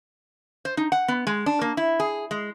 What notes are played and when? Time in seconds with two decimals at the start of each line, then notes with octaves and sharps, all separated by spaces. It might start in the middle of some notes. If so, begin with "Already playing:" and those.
0.65 C5
0.77 D#4
0.92 F#5
1.08 B3
1.27 G#3
1.46 D4
1.61 A#3
1.77 E4
2.00 G#4
2.31 G#3